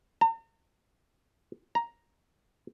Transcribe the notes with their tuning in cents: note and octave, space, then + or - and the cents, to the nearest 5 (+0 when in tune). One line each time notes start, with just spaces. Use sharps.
A#5 -45
A#5 +5